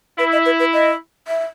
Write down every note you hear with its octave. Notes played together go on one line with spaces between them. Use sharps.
E4 B4
D#5
B4
B4
D#5
E5